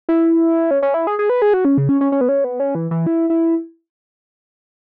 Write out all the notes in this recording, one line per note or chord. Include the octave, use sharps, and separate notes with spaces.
E4
C#4
C#4
E4
G#4
G#4
B4
G#4
F#4
C#4
C#3
C#4
C#4
C#4
B3
C#4
B3
C#4
E3
E3
E4
E4